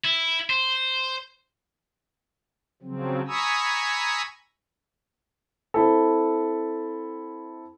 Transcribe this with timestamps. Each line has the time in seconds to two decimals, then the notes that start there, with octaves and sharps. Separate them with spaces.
0.04 E4
0.50 C5
2.83 C#3 F3 F#3 C4
3.27 G#5 A#5 B5 C#6 D#6 E6
5.74 C4 E4 A4